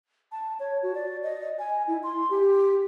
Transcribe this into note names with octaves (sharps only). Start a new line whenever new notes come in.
A5
C#5
F#4
D5
D#5
G#5
E4
C6
G4